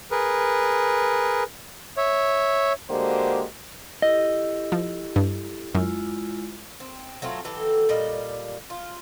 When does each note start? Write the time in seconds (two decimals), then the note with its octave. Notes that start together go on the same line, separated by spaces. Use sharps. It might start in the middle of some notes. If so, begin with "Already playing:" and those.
0.11 G#4 A#4 B4
1.97 C#5 E5
2.90 D3 G#3 A#3 F#4 G4 C5
4.02 E4 G4 A4 D#5
4.72 F3
5.16 G2
5.74 F#2 G#3 E4 F4
6.80 C4
7.22 F#3 A3 C4 F4
7.45 E3 F#3 G4 A4
7.89 A#2 G3 D#5
8.70 F4